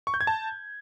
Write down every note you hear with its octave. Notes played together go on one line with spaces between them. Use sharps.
C#6
G6
G#6
A5